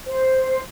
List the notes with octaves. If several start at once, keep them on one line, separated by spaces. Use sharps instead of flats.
C5